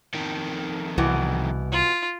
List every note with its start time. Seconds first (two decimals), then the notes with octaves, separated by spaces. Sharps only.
0.15 F2 D#3
0.98 C2 B2 E3
1.72 F4